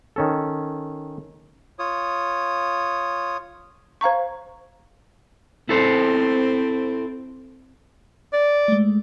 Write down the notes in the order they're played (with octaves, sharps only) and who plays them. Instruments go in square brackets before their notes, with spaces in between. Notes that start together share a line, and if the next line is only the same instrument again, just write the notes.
[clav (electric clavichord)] D#3 C#4 A4
[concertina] F4 C#5 D#6
[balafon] C5 F5 A#5 C#6
[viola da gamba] C4 [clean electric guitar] E4 A4 C5
[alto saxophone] D5
[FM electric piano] G#3 A3